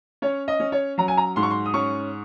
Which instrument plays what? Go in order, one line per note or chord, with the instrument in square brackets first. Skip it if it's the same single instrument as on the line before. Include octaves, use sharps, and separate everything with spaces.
[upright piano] C#4 C#5
D#5
C#4
C#5
F#3 A#5
G#5
A#5
G#2 C6
C#6
C6
D#6
C#4 C#6